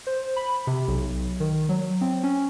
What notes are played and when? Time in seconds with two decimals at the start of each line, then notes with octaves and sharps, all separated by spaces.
0.07 C5
0.36 B5
0.67 C3
0.88 B1
1.40 D#3
1.69 F#3
2.01 C4
2.23 C#4